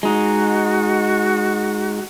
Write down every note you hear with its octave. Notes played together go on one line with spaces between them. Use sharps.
G#3 D#4 F#4